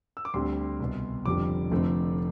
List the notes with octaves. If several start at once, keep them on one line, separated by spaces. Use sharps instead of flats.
E6
D6
D2 D3 G3 C4 C6
C2 B2 B3
F1 F2 D3 G3 D6
F1 F2 D3 A3 C4